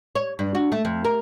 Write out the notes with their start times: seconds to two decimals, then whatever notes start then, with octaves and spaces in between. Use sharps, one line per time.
0.16 C#5
0.39 G2
0.55 F#4
0.72 A3
0.85 F2
1.05 A#4